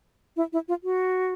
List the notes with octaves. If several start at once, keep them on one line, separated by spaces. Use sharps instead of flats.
E4
E4
F4
F#4